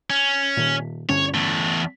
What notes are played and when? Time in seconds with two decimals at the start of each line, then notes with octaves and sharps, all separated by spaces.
0.10 C#4
0.57 A#2 D#3
1.09 G2 D3 C#4 C#5
1.34 E2 A3